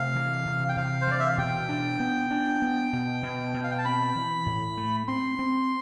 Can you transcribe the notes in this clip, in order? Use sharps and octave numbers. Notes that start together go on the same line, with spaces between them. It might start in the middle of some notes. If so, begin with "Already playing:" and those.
Already playing: C3 A3 F5
E3
C3
G5
C3 F5
C5
E3 D5
E5
F5
B2 G5
D4
B3
D4
B3
B2
B2
B2
F5
G5
A5
C4 B5
E3
A2
A3
C4 C6
C4